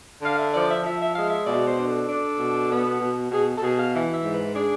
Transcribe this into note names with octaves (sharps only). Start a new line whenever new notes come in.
D3 F5
E5
F3 D5
E5
F3 E5
E5
G#3 F5
E5
B2 D5
C5
D4
A4
D4
B2
B3
B2
B2 G#4
A4
B2 G#4
F5
E3
E5
G#2
B4
D4 G#4